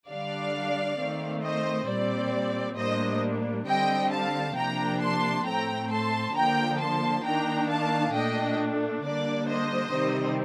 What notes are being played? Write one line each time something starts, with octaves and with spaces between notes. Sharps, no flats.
D3 G3 D4 D5 F5
D#3 A3 C4
C5 D#5
A#2 G3 C4 D5
A2 G3 A#3 D4 C5 D#5
D3 G3 C4 D#5 G5
F5 A5
C3 F3 A#3 D4 G5 A#5
A5 C6
A2 A3 C4 G5 A#5
A5 C6
D3 F3 A#3 G5 A#5
A5 C6
D#3 A#3 D4 G5 A#5
F5 A5
A#2 A3 D4 D#5 G5
D3 G3 A#3 D4 D5
C5 D#5
C3 D#3 G3 C4